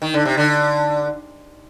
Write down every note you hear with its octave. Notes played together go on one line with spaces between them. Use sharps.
D#3
D3
C3
D3